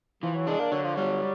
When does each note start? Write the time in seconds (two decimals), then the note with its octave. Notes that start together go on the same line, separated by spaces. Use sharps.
0.23 E3 F3
0.34 F#3
0.47 G#3 D4
0.60 A#3
0.72 D3 F#3
0.84 F3
0.95 F#3 G3